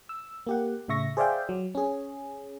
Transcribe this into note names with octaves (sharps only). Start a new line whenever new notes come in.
E6
A#3 G4 F#5
A2 C#3 E5 C#6 A#6
G#4 C5 D5 E5 F5 G5
F#3
C#4 G#4